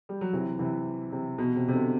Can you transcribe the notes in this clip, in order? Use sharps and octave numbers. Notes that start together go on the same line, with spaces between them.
G3
F#3
C3 E3
C3 E3
C3
B2
C3
C3
B2 D3